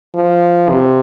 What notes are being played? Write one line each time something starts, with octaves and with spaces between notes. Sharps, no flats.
F3
C3